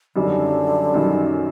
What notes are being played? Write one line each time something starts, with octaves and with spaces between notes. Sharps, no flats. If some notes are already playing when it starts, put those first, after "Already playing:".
F#2 D3 D#3 G3
F#2 D#3 G3